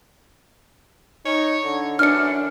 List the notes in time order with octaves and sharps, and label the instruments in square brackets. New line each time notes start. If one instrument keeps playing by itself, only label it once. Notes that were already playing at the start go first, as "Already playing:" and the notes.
[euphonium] D#4 [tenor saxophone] C#5
[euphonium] D3
[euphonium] F#2 [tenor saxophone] E3 [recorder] D4 [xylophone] F6 C#7